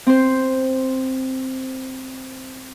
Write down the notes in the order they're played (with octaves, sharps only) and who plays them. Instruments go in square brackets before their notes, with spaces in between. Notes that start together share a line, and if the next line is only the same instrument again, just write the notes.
[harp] C4 C5